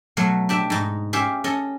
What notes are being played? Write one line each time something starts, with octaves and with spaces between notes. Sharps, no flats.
B2 F#3 A3 F5
D4 G4 E5
G#2 D#4
C#4 G4 E5 F5
C#4 A4 D#5